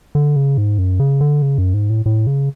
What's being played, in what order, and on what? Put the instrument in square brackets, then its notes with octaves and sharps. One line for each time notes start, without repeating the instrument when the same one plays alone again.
[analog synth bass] D3
C#3
G#2
F#2
C#3
D3
C#3
F#2
G#2
A2
A2
C#3